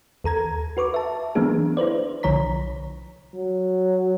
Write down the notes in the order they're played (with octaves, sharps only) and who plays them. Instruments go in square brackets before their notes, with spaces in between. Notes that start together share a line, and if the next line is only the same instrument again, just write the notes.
[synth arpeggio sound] D#2 A4 A#5 G#6
F#4 B4 C#6 D6
E5 A5
E3 F#3 A#3 B3 D4 G#4
E4 B4 C5 D5
B1 D3 F3 C#5 A#5 B6
[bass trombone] F#3